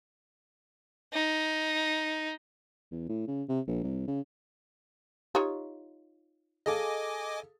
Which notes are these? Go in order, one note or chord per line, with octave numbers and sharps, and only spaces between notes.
D#4
E2
A2
C#3
C3
A#1
C2
C#3
D#4 F4 G4 C#5
G#4 A4 D#5 F5 G#5 D6